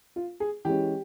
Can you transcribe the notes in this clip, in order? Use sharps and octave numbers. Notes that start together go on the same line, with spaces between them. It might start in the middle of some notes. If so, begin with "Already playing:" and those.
F4
G#4
E3 G#3 C#4 G4